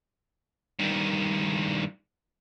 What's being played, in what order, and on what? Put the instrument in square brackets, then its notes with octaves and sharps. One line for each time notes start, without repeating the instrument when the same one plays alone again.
[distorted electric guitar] G2 D#3